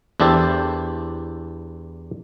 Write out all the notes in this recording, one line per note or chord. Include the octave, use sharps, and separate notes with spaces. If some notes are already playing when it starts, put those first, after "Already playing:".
E2 D4 E4 G4 A4 C5